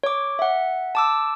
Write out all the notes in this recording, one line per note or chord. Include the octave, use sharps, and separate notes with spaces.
C#5 D6
E5 F#5
A5 D6 E6